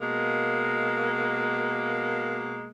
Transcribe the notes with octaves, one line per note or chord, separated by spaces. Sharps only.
B2 G#3 A#3